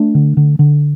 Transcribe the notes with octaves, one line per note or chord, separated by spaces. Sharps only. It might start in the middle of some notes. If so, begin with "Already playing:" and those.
Already playing: A3 D4
D3
D3
D3